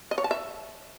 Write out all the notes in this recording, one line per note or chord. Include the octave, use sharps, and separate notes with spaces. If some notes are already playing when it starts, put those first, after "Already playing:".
D#5
C#5
A5
E5